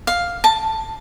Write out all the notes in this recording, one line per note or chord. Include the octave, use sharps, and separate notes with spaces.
F5
A5